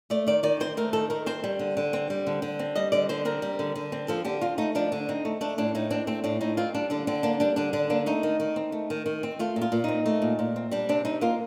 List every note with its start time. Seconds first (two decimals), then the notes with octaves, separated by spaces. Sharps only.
0.10 A3 D5
0.27 D#3 D5
0.43 D#3 D5
0.60 C4 C5
0.77 A3 A#4
0.93 D#3 A4
1.10 D#3 A#4
1.26 C4 C5
1.44 G3
1.59 D3
1.77 D3
1.93 C4
2.10 G3
2.27 D3
2.42 D3
2.59 C4
2.76 G3 D#5
2.92 D3 D5
3.09 D3 C5
3.25 C4 A#4
3.42 G3
3.59 D3
3.75 D3
3.92 C4
4.08 F3 A4
4.25 D3 G4
4.41 C4 F4
4.58 A3 D#4
4.75 F3 D4
4.92 D3
5.09 C4 D#4
5.25 A3
5.41 A3 D4
5.58 A2 D4
5.75 A2 D#4
5.91 C4 D4
6.07 A3 C4
6.24 A2 D4
6.41 A2 D#4
6.57 C4 F4
6.74 G3 D4
6.90 D3 D4
7.07 D3 C4
7.23 A#3 D4
7.40 G3 D4
7.56 D3 D4
7.73 D3 D4
7.90 A#3 D4
8.06 A3 D#4
8.23 D#3
8.40 D#3
8.56 C4
8.72 A3
8.90 D#3
9.06 D#3
9.23 C4
9.39 A3 F4
9.56 A#2
9.61 F4
9.72 A#2
9.84 C4 D#4
10.06 A3
10.22 A#2
10.39 A#2
10.56 C4
10.71 G3 D4
10.89 C3 D4
11.05 C3 D#4
11.21 A#3 F4